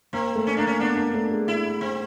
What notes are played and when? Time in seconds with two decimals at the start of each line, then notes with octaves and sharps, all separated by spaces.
0.13 A#3 C4
0.35 A3
0.47 C#4
0.57 A#3 D4
0.67 C#4
0.80 B3 D4
0.97 A#3
1.14 A3
1.31 G#3
1.48 E4
1.81 C4